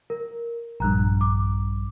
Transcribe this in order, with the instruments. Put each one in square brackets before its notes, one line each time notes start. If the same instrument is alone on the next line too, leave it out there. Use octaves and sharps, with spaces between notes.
[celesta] A#4
[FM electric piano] A#1 G2 [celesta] A#5 F#6
[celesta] D6